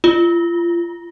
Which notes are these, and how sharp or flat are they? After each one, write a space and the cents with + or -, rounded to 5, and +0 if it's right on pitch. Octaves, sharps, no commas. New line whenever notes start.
F4 -30